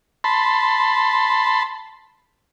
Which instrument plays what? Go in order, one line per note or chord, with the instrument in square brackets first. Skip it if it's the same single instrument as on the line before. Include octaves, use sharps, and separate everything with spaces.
[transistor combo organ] A5 B5 C6